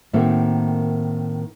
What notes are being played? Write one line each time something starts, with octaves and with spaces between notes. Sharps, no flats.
A2 D#3 A3 A#3 C4 F#4